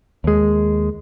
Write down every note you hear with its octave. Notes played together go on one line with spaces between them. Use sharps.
D#2 G#3